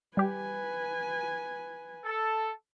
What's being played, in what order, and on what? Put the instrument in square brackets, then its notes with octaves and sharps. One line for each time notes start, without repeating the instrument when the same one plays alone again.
[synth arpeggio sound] G3 G4 [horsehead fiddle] B4 G#5
[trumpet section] A4